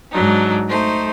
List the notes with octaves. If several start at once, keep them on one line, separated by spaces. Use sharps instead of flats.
G#2 F#3 D4 D#4
A3 D#4 C5